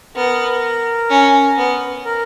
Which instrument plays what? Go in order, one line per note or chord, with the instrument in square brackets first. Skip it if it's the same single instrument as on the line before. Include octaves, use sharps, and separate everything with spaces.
[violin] B3 [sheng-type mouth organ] A#4
[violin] C#4
B3
[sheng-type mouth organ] A#4